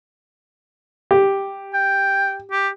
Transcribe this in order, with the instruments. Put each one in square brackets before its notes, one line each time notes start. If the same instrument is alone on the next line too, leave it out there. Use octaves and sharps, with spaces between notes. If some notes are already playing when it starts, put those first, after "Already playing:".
[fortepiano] G4
[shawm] G5
G4